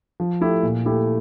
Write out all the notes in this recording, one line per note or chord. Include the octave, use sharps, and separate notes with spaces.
F3
A3 E4 G4
A#2
A3 E4 G4